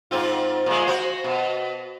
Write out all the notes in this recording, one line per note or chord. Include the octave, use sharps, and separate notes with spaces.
G#2 C4 F4
A#2 G#3
F#4 C5
B2